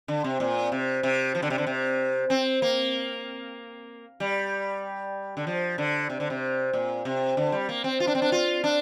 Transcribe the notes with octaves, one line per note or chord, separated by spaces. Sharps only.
D3
C3
A#2
C3
C3
F3
D3
C3
D3
C3
C4
A#3
G3
D3
F3
D3
C3
D3
C3
A#2
C3
D3
G3
A#3
C4
F4
D4
C4
D4
F4
D4